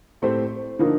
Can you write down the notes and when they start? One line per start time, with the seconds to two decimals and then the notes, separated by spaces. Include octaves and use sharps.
0.22 A2 A3 C4 G4 C5
0.79 D3 F3 A#3 D#4 A#4